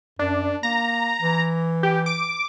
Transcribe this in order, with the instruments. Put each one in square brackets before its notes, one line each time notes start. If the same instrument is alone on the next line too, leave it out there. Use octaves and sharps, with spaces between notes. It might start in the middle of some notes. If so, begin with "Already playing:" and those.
[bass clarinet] F#2 [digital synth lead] D4
[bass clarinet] A#3 [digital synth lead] A#5
[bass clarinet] E3
[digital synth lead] G4
D6